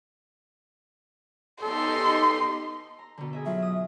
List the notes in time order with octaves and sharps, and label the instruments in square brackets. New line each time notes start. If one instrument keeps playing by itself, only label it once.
[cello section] B3 D#4 G4 [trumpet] A4 [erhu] C6
[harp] A#5
B2 D3
G#4 D#5 E5
[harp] F#3 F4 [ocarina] E5
[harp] D#6